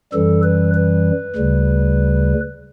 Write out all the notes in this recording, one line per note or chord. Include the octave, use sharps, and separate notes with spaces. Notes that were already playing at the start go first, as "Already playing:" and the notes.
F#2 E3 G3 A4
B4
B4
D2 C#3 G3